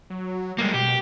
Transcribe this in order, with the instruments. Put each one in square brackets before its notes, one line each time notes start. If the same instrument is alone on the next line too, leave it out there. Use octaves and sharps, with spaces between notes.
[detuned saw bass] F#3
[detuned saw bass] G3 [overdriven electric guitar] G#3 A#3
[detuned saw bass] B2 [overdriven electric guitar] G4